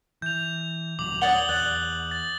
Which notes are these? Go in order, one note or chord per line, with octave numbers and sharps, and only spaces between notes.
E3 G6 F7
D#1 F#3 D6 F7 F#7
C#5 D5 F#5 D#6 F#7 G7
E2 D5 F#6 G7
A6